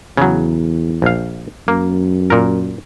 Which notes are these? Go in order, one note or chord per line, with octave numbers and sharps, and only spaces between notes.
E2 C#3 F#3
A#1 F5
F#2 A#3
A#2 A#4